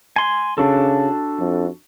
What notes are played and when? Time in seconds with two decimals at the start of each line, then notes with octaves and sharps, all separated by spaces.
0.16 G#5 C6
0.58 C#3 D4 F#4 A4
1.39 F2